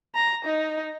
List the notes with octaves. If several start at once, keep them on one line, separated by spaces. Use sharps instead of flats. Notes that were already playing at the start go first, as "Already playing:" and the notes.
A#5
D#4